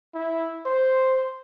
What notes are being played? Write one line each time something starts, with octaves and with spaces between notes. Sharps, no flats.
E4
C5